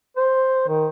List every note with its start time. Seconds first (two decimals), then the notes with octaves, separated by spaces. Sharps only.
0.17 C5
0.68 D#3